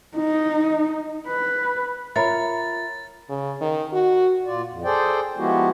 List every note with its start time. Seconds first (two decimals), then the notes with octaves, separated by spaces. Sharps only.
0.17 D#4
1.28 B4
2.16 F4 A#4 C#5 E5 A#5 B5 A6
3.29 C#3
3.61 D#3
3.93 F#4
4.44 A#2 F4 D5
4.69 F2
4.84 G#4 A4 C5 D5 G5
5.37 F3 G#3 B3 E4 F#4 G4